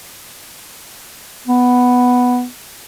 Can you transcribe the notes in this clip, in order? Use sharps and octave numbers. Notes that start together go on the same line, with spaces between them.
B3